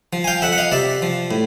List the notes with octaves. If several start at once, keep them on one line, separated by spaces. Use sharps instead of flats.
F3
G#5
F5 G5
F2 E5 F#5
F#5
D#5 F5
C3 D5 E5
F3
A2